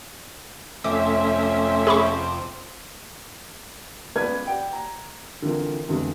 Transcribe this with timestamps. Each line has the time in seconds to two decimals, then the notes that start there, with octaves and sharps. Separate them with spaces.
0.84 F2 C3 A3 C#4 E5 D6
1.87 G#4 B5 C#6
4.16 C#2 B3 B4 D5 G#6
4.47 D5 F#5 G5
4.73 A#5
5.42 D3 E3 F3 C4 A#4
5.89 F2 G#2 B2 D3 E3